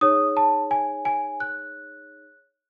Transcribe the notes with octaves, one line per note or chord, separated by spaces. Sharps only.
D#4 G#4 C#5 D#6
A5
G#5
G#5
F#6